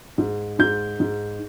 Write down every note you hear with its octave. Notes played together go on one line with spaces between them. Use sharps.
G#2
G#2 G6
G#2